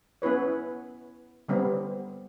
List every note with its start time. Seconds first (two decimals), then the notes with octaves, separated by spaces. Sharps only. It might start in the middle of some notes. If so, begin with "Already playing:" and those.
0.22 B3 C#4 E4 B4 C#5
1.48 D3 G3 B3 C4